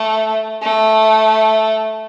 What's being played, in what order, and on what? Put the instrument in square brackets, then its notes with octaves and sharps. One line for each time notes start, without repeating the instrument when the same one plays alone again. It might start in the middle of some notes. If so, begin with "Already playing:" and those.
Already playing: [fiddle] A3
A3